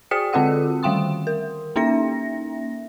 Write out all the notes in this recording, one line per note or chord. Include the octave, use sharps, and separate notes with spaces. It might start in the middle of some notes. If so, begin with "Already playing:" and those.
F#4 G#4 D5 G5 D#6 C#7
D3 C4 F4 A4 F#5 E6
D#3 G3 F5 G5 C6 D#6
A#4
A#3 C#4 D#4 E5 A#6